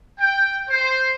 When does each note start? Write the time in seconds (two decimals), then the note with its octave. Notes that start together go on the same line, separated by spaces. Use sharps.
0.20 G5
0.70 C5